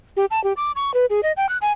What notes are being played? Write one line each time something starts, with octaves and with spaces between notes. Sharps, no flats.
G4
A5
G4
D6
C#6
B4
G#4
D#5
G5
F#6
G#5